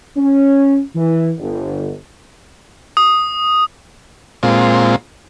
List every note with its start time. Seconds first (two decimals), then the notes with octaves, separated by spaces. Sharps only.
0.16 C#4
0.95 E3
1.38 G1
2.97 D#6
4.43 A#2 G#3 C4 F4